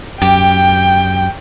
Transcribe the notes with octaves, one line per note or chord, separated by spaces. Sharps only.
F#2 G4 G5